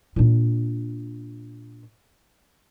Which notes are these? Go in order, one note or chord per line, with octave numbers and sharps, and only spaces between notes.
A#2 D4